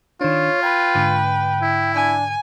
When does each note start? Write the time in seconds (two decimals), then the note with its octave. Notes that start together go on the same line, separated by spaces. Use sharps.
0.21 D#3 D4 F4 C#5
0.63 B4 G5 G#6
0.95 G#2 D3
1.62 E4
1.95 D4 G#5